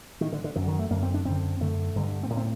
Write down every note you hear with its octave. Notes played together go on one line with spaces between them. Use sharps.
A2 D#3
D3
D3
F#2 D3 D#3
D#3
A3
F#2 D3 A#3
C4
D4
F#2 D3 C4
F#2 D3 A3
G2 D3
C4
A2 A#3
C4